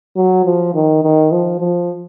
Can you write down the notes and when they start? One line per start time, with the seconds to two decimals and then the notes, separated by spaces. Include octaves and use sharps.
0.16 F#3
0.45 F3
0.74 D#3
1.03 D#3
1.32 F3
1.60 F3